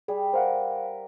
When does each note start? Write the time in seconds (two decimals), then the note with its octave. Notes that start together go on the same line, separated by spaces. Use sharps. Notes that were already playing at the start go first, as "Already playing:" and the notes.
0.08 G3 G#4
0.33 A#4 C5 F5 F#5